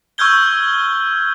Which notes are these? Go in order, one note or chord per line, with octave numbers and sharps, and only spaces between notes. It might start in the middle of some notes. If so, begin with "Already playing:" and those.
C#6 E6 F6 G6 G#6 G7